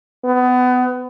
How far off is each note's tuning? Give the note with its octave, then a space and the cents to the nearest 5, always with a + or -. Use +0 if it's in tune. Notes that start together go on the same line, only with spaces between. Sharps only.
B3 +25